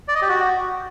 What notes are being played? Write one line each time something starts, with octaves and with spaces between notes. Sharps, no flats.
D5
D#5
G4
F#4